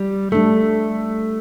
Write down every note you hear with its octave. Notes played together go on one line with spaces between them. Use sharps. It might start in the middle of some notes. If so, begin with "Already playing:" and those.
Already playing: G3
G3 A3 D4 A4